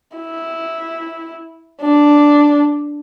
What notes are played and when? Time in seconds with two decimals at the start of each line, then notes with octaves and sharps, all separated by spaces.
0.17 E4
1.82 D4